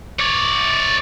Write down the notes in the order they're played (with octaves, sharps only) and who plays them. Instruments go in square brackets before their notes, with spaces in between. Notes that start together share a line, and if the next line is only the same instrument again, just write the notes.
[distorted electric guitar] C#5 D5